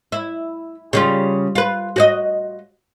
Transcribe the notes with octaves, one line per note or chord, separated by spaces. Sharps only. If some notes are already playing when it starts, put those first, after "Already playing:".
E4
C#3 G3 F4
F4 B4
F#4 C5 D#5